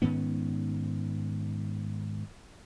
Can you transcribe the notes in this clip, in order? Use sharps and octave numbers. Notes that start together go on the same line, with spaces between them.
G#2 D#3 B3 C#4